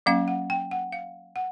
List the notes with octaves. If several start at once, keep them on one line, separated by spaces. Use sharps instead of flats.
F#3 A#3 C#4 F5
F#5
G5
F#5
F5
F#5